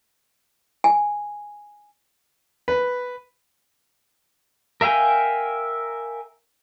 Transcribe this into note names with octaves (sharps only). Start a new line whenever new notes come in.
G#5
B4
A#4 E5 F5 G5 G#5